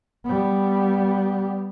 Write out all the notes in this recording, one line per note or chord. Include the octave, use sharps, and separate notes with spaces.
G3 B3